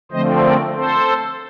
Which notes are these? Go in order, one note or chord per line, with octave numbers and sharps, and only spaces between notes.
D3 F3 A3 C4 C5 D#5
A#4 D5
A4 C5